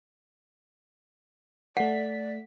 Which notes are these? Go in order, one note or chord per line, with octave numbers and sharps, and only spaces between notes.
A3 D5 F#5 B6